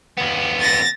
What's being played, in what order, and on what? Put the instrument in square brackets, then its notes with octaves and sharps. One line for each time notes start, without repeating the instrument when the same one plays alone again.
[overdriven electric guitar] D#2 B3
[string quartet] A6 A#6